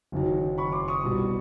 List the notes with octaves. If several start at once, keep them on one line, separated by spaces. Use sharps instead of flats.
F#1 F#2 D#3 F#3
B5 C#6
C6 D6
C#6 D#6
C2 B2 G3